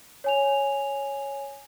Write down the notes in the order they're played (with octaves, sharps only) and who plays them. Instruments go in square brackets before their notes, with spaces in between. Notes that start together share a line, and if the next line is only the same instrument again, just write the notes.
[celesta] C#5 G#5 F7